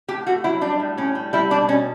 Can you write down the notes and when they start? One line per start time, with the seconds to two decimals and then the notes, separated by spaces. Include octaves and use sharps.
0.08 A2 G4
0.27 A3 F#4
0.44 F#3 E4
0.61 G3 D4
0.80 A2
0.98 A2 C#4
1.15 G3
1.33 G3 E4
1.51 B2 D4
1.68 B2 C#4